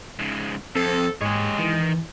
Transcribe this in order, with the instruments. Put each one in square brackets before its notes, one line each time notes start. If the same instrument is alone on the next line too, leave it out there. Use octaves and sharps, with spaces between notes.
[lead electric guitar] G#2 C#3
[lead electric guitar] F2 [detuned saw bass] C4 [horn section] A4
[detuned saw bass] G#2 [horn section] G#3 [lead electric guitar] G4 C#5
[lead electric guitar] D#3 [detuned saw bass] E3